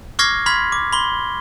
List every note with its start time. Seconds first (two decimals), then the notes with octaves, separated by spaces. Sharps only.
0.19 C#6 D6 F6 G#6 A#6 C7
0.46 B5 C6 F6 G#6 B6
0.72 D6
0.93 B5 C6 G7